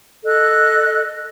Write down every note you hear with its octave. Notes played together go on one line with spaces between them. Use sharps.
A4 D#5 F#6